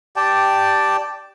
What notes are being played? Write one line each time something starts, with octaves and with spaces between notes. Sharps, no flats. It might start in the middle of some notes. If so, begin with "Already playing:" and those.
G4 D5 G5 A5